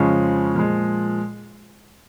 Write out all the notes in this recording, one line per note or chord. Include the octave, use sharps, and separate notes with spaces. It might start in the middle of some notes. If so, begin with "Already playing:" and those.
Already playing: F2 C#3 F3 G#3 C#4
A#2 F3 G#3